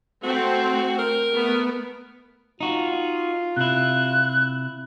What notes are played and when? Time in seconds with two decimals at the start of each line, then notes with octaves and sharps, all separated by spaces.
0.23 A3 C4 F#4
0.98 A#4
1.31 A3 B3
2.61 D#4 F4 F#4
3.57 C3 E4 F#6